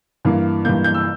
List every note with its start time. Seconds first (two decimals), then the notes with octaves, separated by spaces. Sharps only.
0.25 G2 E3 A#3
0.65 G2 E3 A#3 G6
0.84 G6
0.94 E6